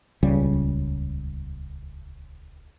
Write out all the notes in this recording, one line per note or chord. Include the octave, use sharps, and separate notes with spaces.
D#1 C#2 C#3 G3